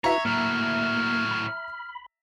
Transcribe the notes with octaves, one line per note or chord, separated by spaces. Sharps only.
E4 F#4 B4 C#5 E5 A#5
A2 F#3 A#3 F6
B5